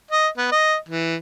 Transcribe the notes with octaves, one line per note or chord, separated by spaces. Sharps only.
D#5
B3
D#5
E3